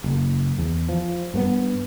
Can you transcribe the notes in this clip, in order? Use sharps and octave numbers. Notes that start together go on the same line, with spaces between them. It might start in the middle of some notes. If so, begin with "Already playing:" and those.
F#1
E2
F3
G2 A#3 B3